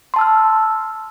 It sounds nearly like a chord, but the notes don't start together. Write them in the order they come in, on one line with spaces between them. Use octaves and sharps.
C6 A5 E6 F6